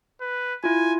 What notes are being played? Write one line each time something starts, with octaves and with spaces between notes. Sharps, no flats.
B4
E4 F4 G#5